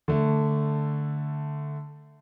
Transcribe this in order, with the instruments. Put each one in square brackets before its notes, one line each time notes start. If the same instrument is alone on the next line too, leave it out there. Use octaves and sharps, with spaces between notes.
[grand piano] D3 A3